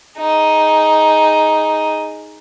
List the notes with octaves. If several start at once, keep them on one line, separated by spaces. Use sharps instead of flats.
D#4 G#4